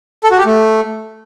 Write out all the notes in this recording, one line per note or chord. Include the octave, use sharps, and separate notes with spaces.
A4
F#4
G4
A3